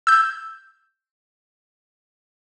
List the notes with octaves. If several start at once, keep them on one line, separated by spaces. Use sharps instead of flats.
E6 G6